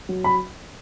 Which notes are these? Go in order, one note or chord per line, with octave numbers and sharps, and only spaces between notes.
F#3
B5